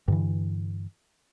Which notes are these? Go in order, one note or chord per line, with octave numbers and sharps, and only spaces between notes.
G2 D3 E3